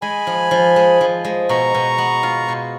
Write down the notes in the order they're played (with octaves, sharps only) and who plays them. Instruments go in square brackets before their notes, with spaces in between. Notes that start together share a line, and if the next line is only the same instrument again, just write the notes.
[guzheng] G#3 [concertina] G#5 B5
[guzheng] F3
F3
G#3
F3
G#3
[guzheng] B2 [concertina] A#5 C#6
[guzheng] B2
B3
F4
B2